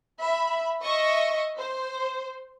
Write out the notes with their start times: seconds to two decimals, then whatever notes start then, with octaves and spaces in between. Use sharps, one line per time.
0.20 E5 B5
0.83 D#5 E5 C#6
1.57 C5